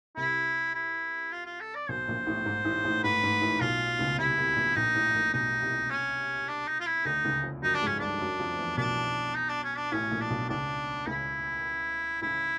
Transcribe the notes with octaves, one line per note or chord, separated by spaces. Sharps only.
C2 C3 E4
E4
F4
F4
A4
D5
B1 B2 C5
A#1 A#2
A1 A2
G#2
A1 A2
A1 A2
G#2 B4
G#2
A1 A2
B1 B2 F4
C#2 C#3
C2 C3 E4
C2 C3
A#1 A#2
A#1 A#2 D#4
A1 A2
A#1 A#2
B1 B2 D#4
C2 C3
C#4
D4
D#4
F4
E4
D2 D3 D#4
C#2 C#3
F2 F3
F#2 F#3 D#4
D4
G#2 G#3 C#4
G2 G3 D4
F#2 F#3
F2 F3
E2 E3
B1 B2 D4
D#4
D4
C#4
D4
A1 A2 C#4
A#1 A#2
D4
B1 B2
C#2 C#3 D4
C#2 C#3 E4
C#2 C#3 E4